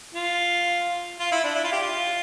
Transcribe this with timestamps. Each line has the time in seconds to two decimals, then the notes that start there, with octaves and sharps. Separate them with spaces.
0.14 F4
1.20 F4
1.32 E4
1.44 D4
1.55 E4
1.64 F4
1.72 G4
1.82 F4